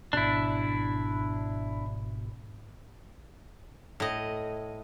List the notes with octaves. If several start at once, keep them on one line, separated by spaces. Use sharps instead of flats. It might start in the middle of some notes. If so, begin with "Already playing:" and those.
G#1 B2 D4 E4
A2 D#5